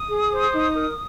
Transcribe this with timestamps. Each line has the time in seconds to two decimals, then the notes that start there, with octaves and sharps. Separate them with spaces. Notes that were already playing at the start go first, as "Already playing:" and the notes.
Already playing: D#6
0.09 G#4
0.32 C5
0.53 D#4
0.75 A#4